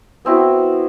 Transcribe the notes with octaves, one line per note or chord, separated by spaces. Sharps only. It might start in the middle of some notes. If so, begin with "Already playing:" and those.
B3 C4 E4 F#4